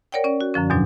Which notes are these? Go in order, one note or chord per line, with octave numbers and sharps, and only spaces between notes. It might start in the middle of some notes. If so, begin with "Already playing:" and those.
A#4 C#5 D5 F#5 G5
C#4 D5
F#4
F#2 D3 F3 C#4
E2 G#2 B2 F#3 D4